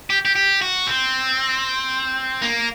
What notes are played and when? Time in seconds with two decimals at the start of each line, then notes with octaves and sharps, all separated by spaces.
0.10 G4
0.25 G4
0.36 G4
0.62 F#4
0.87 C4
2.42 A#3